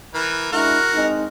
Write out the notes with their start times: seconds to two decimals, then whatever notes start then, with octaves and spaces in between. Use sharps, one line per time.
0.14 E3 A#4
0.52 G#3 D4 E4 F#4 A#4
0.93 G#3 C4 D#4